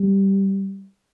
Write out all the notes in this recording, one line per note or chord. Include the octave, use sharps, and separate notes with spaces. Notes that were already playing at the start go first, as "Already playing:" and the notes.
Already playing: G3